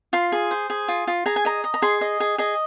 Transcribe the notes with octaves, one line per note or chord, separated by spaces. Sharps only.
F4 C6
G#4
C5
G#4
F4
F4
G#4 A#5
G#5
D#5 A#5
D#5
A#5
G#4 C6
D#5
G#4
G#4 D#5